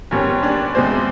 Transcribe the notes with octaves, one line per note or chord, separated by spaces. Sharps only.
G#2 D#3 G3 B3 C#4 C#5
D4 D5
E2 B2 G#3 C4 C5